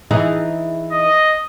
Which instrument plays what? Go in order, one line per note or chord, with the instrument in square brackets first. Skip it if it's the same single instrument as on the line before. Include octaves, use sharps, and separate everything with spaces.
[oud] E3 D#4 G#4
[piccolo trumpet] D#5